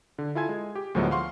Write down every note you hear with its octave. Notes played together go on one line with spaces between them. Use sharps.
D3
E4 F4 A4 G#5 G#6
G#3
G4
D2 A2 F3 F#3 G#3 B3
F5 F#5 C6 C#6